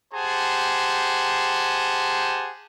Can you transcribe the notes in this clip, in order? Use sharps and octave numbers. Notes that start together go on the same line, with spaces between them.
G4 G#4 C5 F#5 A5